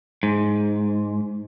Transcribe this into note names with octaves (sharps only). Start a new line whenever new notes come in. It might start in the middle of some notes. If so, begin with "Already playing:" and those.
G#2